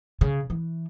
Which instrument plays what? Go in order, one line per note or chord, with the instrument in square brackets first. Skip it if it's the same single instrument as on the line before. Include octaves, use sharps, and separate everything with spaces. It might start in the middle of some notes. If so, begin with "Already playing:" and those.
[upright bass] C#3
E3